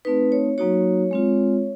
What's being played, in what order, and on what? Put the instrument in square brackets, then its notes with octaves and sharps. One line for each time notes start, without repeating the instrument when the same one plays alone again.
[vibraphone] A3 C4 D#4 B4
C#5
F#3 A#3 D#4 F#4 C#5
G#3 C4 F4